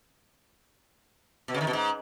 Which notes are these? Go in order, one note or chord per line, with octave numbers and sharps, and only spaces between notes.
B2
C#3
D#3
B2
G#2